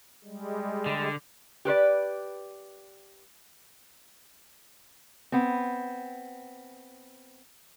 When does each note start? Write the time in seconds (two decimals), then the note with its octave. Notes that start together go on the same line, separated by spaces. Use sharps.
0.24 G3 G#3
0.86 D3
1.65 G4 B4 C5 D5
5.32 B3 C4